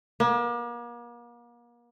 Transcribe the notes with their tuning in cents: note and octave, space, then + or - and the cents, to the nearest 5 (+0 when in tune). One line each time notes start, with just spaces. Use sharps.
A#3 +40